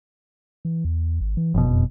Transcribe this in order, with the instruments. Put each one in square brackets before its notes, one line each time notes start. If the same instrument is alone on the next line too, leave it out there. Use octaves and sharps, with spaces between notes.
[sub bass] E3
E2
G#1
E3
[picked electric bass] F#1 B2 [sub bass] F3
[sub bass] F2